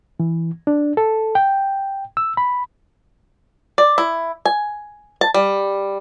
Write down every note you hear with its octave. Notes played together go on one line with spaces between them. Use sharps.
E3
D4
A4
G5
E6
B5
D5
E4
G#5
A5
G3